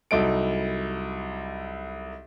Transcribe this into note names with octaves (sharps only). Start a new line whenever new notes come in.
C2 F#3 D#4 A4 D7